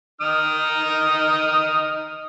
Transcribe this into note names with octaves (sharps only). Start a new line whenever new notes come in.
D#4 D#6 F6